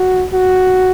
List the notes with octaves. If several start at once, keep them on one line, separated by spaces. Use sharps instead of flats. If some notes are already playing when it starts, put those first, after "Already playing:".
Already playing: F#4
F#4